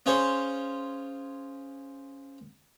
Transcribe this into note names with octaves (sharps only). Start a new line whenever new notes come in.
C#4 F4 G#4 C5 C#5